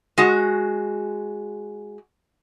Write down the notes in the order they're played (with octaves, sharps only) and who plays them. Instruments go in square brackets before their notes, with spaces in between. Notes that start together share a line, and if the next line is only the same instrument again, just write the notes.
[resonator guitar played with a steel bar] G#3 F#4